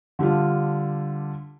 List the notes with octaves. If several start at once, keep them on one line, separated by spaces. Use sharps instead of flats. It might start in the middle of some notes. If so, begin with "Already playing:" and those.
D3 G3 D4 F4